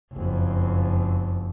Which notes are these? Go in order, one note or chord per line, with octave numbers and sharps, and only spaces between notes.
F#1 F2